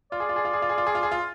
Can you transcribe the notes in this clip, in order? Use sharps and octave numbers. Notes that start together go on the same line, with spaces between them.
F4 D5
G#4
F4
G#4
F4
G#4
F4
G#4
F4
G#4
F4
G#4
F4